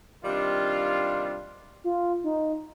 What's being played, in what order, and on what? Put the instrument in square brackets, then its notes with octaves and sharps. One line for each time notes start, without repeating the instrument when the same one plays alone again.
[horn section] C3 D#3 G3 D4 F4
[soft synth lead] F4
D#4